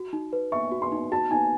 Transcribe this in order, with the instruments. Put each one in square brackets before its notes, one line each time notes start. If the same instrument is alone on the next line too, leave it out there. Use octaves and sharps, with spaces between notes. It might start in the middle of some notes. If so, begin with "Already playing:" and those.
Already playing: [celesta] F#4
D#4
B4
[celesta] E5 [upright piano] C#6
[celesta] F#4
[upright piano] C6
[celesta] D#4
[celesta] F#4 [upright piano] A5
[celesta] D#4 [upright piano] G#5